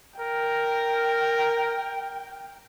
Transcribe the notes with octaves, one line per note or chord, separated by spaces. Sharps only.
A#4 G5